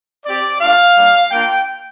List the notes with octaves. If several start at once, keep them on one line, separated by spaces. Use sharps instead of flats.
C4 G4 D5
A3 D4 F4 F5
G3 A#3 D4
A#3 D4 F4 G5